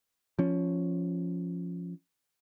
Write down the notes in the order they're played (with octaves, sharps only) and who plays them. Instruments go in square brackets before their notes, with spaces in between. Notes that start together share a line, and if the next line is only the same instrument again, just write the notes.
[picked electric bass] F3 C#4